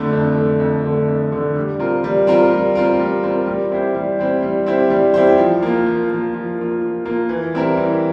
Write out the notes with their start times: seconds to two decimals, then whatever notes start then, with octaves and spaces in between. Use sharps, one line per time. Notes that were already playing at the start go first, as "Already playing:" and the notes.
Already playing: F2 D3 A3
0.13 F2
0.36 D3 A3
0.60 F2
0.84 D3 A3
1.08 F2
1.32 D3 A3
1.56 G3
1.80 C4 F4 A#4
2.04 G3
2.27 C4 F4 A#4
2.52 G3
2.75 C4 F4 A#4
2.99 G3
3.24 C4 F4 A#4
3.47 G3
3.71 C4 E4 G4 C5
3.95 G3
4.19 C4 E4 G4 C5
4.42 G3
4.66 C4 E4 G4 C5
4.90 G3
5.14 C4 E4 G4 C5
5.38 F3
5.62 A#3 F4
5.86 F3
6.10 A#3 F4
6.34 F3
6.58 A#3 F4
6.82 F3
7.05 A#3 F4
7.29 E3
7.54 G3 C4 E4 A#4
7.77 E3